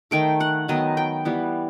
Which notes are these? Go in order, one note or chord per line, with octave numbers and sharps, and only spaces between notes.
D#3 A3 G5
F#5
D#3 F#3 B3 D#5
G5
E3 G3 B3